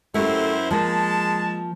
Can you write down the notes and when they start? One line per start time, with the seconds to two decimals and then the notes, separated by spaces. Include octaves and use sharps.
0.14 F#2 A3 E4 G4 C5
0.71 F3 G#3 A#3 A5